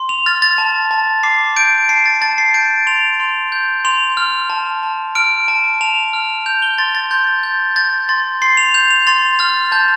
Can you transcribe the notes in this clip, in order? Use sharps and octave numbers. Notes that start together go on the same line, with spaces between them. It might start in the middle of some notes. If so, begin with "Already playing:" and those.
Already playing: C6
F7
F6 A6
A6
A5
A5
D6 C7
G6 D7
A5 C7
A6
A5 A6
C7
G6 D7
C6 F7
C6
G6
C6 F7
F6
A5
A5
F6 D7
A5
A5 F7
F6
G6 F7
G7
C6 A6
A6
C6 G6
G6
G6 A6
C6 A6
C6 C7
F7
G6 F7
F7
C6 A6
F6 A6
A5 G6